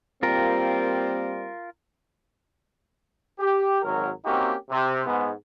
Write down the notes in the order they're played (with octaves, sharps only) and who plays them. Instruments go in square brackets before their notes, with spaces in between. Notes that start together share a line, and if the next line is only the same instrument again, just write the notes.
[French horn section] G3 A#3 C4 [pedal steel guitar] F4 A#4
[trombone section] G4
G#1 F#3 A#4
A#3 C4 C#4 D#4 F#4 G4
C3
G#2 B3